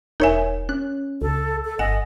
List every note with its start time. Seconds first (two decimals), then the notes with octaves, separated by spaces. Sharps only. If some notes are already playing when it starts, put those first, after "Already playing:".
0.20 E1 D#4 A#4 C#5 E5 G#5
0.69 C#4 F#6
1.22 C#2 A4
1.65 A4
1.79 G1 D#5 F#5 G#5